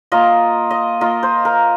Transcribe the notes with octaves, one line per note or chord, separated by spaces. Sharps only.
A#3 F4 D#5
D#5
A#3 F4 D#5
C5
A#4